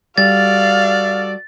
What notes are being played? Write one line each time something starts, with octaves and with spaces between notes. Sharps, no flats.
G3 F#4 A4 D5 F5 A6